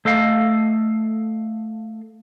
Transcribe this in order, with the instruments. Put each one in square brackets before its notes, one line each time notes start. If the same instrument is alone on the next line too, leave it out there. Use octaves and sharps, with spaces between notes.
[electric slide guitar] A3 A4 D#5 F5